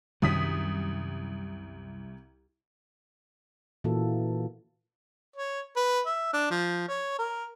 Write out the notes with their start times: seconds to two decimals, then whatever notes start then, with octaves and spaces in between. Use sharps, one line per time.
0.22 C2 F#2 D#3 F#3 D#6 B6
3.84 A#2 E3 A#3 C#4 F#4 A4
5.36 C#5
5.76 B4
6.06 E5
6.33 D4
6.50 F3
6.88 C#5
7.19 A#4